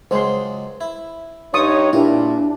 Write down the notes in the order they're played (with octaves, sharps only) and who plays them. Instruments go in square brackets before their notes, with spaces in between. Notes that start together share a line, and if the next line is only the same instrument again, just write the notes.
[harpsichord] C#2 F#3 G#3 [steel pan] C5 C6
[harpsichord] E4
[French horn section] G2 D#4 C#5 [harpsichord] F4 [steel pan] C#6 D#6
[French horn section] A#2 [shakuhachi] D4 [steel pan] E4 G4 [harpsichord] A#4